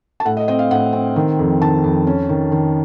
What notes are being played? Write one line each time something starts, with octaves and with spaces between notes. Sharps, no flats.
A5
A2 F#5
D#5
C4 D#5
F5
A2 F#5
C4
D#3
F2
D#3 A5
F2
C#4
D#3
D#3